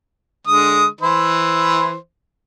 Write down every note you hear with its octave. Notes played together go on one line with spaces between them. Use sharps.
D3 G#3 D#6
E3 E4 C5